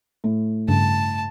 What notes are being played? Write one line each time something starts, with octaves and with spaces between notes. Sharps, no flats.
A2
G2 C#3 A5